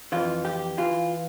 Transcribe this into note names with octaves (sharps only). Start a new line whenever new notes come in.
F2 E3 F4
G4
E3 F4